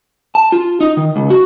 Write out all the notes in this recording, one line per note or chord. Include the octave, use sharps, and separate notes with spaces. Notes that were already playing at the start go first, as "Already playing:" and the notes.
A5
F4
D#4
D#3
C#2
F#4